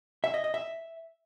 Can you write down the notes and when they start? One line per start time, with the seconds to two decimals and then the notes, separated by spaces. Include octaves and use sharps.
0.24 E5
0.34 D#5
0.44 D#5
0.54 E5